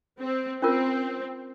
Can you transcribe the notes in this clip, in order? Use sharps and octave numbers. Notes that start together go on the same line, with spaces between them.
C4
C4 C#4 F4 A#4